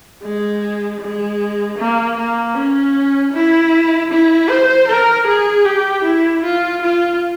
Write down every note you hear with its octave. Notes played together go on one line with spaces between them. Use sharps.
G#3
G#3
A#3
A#3
C#4
E4
E4
C5
A#4
G#4
G4
E4
F4
F4